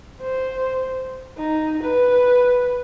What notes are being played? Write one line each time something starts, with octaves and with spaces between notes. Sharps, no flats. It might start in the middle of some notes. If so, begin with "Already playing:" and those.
C5
D#4
B4